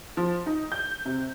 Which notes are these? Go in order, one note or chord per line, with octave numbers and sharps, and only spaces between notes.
F3
D#4
G6
C3